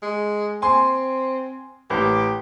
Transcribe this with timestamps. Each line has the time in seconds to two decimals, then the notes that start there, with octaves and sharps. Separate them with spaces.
0.02 G#3
0.62 C4 G#5 C6
1.90 A1 G4